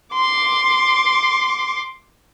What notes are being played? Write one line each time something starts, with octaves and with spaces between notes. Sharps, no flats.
C6 D6